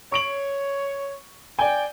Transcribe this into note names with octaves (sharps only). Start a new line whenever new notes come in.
C#5 C#6 D7 F#7
D5 G5 G#5